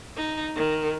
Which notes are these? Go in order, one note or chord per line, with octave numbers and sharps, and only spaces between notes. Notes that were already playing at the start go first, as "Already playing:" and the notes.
D#4
D#3